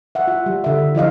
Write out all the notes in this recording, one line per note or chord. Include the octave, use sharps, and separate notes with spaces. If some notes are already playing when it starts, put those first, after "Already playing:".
E5 F#5
F4
G3
D3 E5
F3 E4 D#5 F5